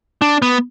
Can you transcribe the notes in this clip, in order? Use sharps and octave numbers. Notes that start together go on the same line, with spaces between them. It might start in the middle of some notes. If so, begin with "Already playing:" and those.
D4
B3